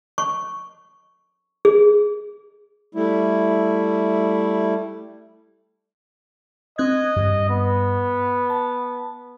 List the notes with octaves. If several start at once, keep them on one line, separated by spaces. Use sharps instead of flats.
C#6
G#4
G3 A3 E4
C4 D#5 F#6 G#6
G2
B3
A5